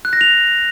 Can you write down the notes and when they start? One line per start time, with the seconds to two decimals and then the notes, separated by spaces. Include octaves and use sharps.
0.05 F#6
0.13 A#6
0.21 F7